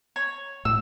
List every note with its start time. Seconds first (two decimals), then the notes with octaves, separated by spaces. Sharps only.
0.16 C#5
0.65 A2 E6